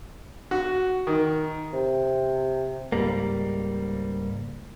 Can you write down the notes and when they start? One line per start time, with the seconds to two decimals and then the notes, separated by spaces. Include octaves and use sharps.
0.51 F#4
1.07 D#3
1.73 C3
2.92 C#2 G#2 G3 A#3